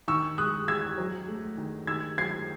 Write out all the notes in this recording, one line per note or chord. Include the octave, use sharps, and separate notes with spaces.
D#3 C#6 E6
G#3 D#6 F#6
E2 E6 G#6
F#3
A3
D#3
D#3 E6 G#6
F#3 G#6 C7